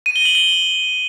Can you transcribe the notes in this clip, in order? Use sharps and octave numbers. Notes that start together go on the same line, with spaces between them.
D#7
G7
F#7
G7